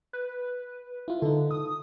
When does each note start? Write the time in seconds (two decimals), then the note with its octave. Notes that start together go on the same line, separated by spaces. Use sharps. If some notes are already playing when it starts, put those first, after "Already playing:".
0.13 B4
1.08 E4 F4
1.22 D3 D#4 A4
1.51 D#6